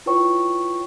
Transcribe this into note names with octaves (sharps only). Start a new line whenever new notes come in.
E4 F4 B4 C#5 G5 C#6